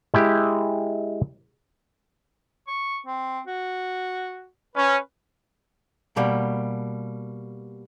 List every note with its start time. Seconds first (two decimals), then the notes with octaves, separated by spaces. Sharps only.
0.14 G#3 E4 G4
2.68 C#6
3.07 C4
3.47 F#4
4.76 C#4 B4
6.16 B2 G3 A#3